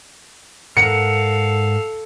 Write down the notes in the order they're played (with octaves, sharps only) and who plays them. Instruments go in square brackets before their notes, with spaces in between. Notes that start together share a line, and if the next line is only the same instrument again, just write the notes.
[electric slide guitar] G#2 A#4 F#5 [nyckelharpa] A4 F5 [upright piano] C#7